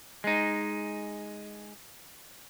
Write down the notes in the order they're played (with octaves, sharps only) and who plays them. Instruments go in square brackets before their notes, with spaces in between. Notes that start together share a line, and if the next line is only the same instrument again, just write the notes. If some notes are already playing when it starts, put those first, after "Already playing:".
[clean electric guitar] G#3 D#4